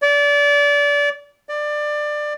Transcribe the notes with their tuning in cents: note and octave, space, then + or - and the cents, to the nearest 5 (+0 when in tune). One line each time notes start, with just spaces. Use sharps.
D5 -25
D5 +20